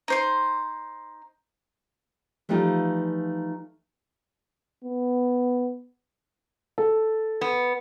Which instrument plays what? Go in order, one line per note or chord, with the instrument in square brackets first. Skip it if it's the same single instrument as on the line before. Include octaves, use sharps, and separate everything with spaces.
[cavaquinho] D#4 C5 C6
[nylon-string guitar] E3 F3 G3 A3 D#4 F4
[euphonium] B3
[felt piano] A4
[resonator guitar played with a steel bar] B3